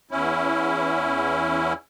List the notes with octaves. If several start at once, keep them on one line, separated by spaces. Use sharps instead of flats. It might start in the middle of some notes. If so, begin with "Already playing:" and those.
E2 C#4 E4